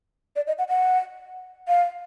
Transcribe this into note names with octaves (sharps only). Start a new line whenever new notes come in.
D5
D#5
F#5
F#5
F5